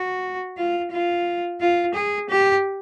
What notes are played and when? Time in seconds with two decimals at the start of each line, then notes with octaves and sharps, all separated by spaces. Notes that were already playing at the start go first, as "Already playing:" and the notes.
Already playing: F#4
0.57 F4
0.91 F4
1.60 F4
1.94 G#4
2.29 G4